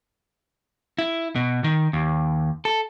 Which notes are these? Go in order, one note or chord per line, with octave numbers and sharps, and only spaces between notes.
E4
B2
D#3
D#2
A4